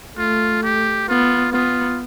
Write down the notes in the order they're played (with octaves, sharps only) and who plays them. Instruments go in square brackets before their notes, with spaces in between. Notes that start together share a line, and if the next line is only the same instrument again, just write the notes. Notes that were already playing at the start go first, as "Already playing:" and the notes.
[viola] A3 [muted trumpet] F4
[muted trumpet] G4
[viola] B3 [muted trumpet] F4
[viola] B3 [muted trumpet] F4